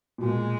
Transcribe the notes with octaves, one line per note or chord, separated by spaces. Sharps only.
B2
A#2 G#3